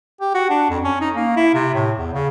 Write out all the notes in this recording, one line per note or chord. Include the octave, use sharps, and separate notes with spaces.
G4
F#4
D4
F2
C#4
D#4
A#3
E4
C3
A2
E2
C#3